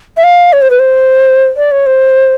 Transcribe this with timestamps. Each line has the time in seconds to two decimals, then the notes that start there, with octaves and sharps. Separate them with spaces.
0.17 E5
0.24 F5
0.53 C#5
0.62 C5
0.70 B4
0.79 C5
1.57 D5
1.71 C#5
1.86 C5